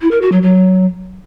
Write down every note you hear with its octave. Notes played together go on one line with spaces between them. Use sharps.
E4
A#4
F#4
F#3
F#3